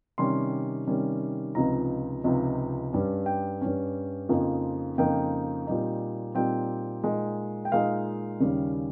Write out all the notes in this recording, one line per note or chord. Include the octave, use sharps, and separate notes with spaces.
C3 D#3 G3 C#4 C6
C3 D#3 G3 C#4
C#2 C3 F3 C4 D#4 A#5
C#2 C3 F3 C4 D#4
G2 G3 C#4
G5
G2 G3 C#4
F2 C#3 F3 A#3 D#4
F2 C#3 F3 A#3 D#4 G5
A#2 G3 C4 D#4
A#2 G3 C4 D#4 G5
A#2 G#3 D#4
G5
A#2 G#3 D#4 F5
D#2 C#3 G3 C#4